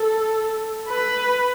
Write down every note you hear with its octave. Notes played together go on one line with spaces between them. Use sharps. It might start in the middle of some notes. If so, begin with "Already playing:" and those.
Already playing: A4
B4